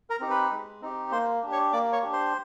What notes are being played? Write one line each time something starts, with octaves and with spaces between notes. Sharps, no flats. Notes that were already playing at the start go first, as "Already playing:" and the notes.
A#4 A#5
C4 D#4 G4
B4 B5
G#3
C4 D#4 G4
A#3 C5 C6
D4 G4
C#5 C#6
A#3 D5 D6
C#5 C#6
D4 G4
C5 C6